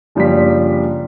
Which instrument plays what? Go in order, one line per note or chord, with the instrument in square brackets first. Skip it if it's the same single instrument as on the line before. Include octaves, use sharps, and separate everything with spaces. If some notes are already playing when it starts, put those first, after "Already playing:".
[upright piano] F#1 F3 G3 D4 B6